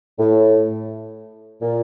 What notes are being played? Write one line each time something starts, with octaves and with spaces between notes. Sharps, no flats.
A2
A#2